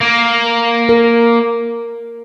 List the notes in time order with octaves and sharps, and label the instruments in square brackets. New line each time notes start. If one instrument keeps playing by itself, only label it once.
[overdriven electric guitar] A#3
[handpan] A#4